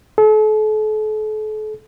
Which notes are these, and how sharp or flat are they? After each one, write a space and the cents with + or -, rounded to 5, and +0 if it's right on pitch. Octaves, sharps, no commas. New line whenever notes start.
A4 -40